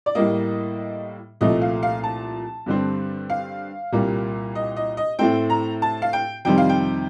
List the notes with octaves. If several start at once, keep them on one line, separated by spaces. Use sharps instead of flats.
D5
A2 G3 A#3 D#5
C2 A#2 F3 A3 D#5
F5
F5
A5
G2 D3 G3 C4
F5
C2 A#2 G3 A#3
D#5
D#5
D#5
A2 A3 C4 G5
A#5
A5
F5
G5
F2 C3 D#3 G3 C4 G5
F5
G5